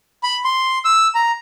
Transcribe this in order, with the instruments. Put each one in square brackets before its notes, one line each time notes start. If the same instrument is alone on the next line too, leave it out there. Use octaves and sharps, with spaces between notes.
[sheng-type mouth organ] B5
C6
E6
A#5